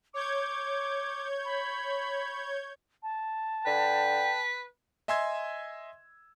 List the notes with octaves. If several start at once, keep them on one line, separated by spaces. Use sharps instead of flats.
C#5 D6 G6 G#6
B5
A5
D3 B4 G5
D#5 E5 G#5 C6 E6 G#6